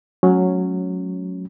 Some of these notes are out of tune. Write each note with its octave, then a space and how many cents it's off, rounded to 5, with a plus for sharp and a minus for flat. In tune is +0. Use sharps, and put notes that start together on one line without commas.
F#3 -10 A3 -40 C#4 +0